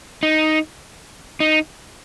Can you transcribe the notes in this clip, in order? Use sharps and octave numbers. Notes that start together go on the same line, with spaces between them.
D#4
D#4